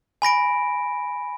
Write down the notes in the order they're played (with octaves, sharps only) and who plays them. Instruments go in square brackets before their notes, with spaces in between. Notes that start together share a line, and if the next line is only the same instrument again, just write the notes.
[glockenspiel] G#5 B5 A#6 D7